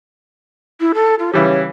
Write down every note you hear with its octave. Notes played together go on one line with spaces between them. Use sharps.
E4
A4
F4
C#3 E3 G3 C#5